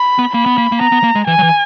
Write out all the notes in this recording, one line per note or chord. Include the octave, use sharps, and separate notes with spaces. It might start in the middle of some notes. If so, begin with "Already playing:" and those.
Already playing: B5
B3
A#3 B5
B3
A#3
A#3
B3 A#5
B3
A#3
G#3
E3 G#5
F#3
E3